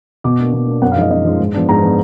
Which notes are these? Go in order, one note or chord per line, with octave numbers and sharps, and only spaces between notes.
B2 D6
A#3 D4
B2
A#3 D4
F#2 F#5
F5
F3 G#3 D#4 D#5
F#2 D#5
F3 G#3 D#4
G#2
F3 B3 D4
G#2 A#5
F3 B3 D4